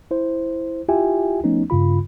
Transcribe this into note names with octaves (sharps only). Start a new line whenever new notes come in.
E4 C5
E4 F4 G4 E5 G5 G#5
F3 A3 B3 C#4 D#4
G2 C#3 F4 B5